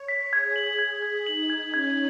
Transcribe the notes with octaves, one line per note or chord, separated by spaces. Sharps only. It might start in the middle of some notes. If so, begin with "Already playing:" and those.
Already playing: C#5
B6
G#4 G#6
F#7
G#4 G#6
G#6
D#4 F#7
G#6
C#4 G#6